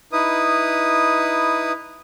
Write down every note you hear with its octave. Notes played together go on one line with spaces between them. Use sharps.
D#4 E4 B4 D#6